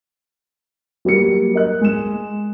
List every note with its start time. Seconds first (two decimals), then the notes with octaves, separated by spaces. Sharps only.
1.05 F#3 G3 A#3 C#7
1.54 A#4 D#5 F#6
1.81 G#3 E7